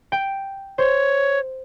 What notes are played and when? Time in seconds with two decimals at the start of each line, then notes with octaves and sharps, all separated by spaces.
0.12 G5
0.78 C5 C#5